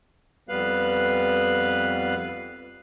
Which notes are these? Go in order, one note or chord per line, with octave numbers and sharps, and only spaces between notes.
F2 G3 B3 B4 F5 F#6